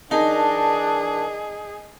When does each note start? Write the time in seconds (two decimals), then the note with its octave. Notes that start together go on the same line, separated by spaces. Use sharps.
0.11 E3 D4 D#4 G#4 A#4 A5